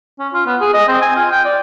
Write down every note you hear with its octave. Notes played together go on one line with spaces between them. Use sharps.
C#4
F4
B3
G#4
D#5
C4
G#5
F4
G5
D5